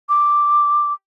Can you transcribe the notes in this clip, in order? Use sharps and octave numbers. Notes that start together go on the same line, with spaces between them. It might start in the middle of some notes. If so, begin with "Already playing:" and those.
D6